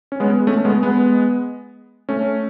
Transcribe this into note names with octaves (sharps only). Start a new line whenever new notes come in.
C#4
G#3 B3
A3 C#4
G#3 B3
G#3 B3
A3 C#4